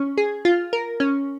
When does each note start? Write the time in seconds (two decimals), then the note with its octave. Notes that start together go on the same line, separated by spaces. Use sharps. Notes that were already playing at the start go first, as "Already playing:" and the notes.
Already playing: C#4
0.18 G#4
0.45 F4
0.73 A#4
1.00 C#4